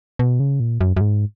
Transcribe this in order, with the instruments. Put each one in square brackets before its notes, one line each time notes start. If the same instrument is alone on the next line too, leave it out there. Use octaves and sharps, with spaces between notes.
[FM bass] B2
C#3
A#2
F#2
F#2
G#2